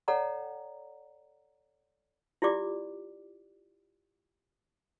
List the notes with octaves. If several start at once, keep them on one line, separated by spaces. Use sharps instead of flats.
A4 C#5 D5 F#5 G5 A#5
E4 F4 G4 D5 D6